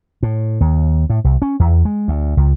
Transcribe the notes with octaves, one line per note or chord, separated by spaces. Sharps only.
A2
D#2
A2
C2
C#4
E2
G#3
D2
C#2